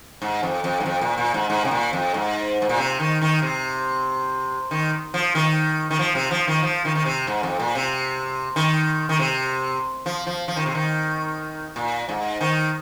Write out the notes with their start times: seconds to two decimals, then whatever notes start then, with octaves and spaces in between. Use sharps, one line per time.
0.22 G#2
0.43 F2
0.64 F2
0.80 G#2
0.86 F2
1.01 A#2
1.18 A#2
1.34 G#2
1.50 G#2
1.65 C3
1.71 A#2
1.93 F2
2.14 G#2
2.62 G#2
2.69 A#2
2.78 C3
3.00 D#3
3.21 D#3
3.42 C3
4.71 D#3
5.14 F3
5.35 D#3
5.91 D#3
5.99 F3
6.15 C3
6.31 F3
6.48 D#3
6.63 F3
6.85 D#3
6.95 D#3
7.05 C3
7.27 G#2
7.43 F2
7.59 A#2
7.75 C3
8.56 D#3
9.09 D#3
9.19 C3
10.06 F3
10.27 F3
10.48 F3
10.56 D#3
10.66 C3
10.75 D#3
11.76 A#2
12.09 G#2
12.41 D#3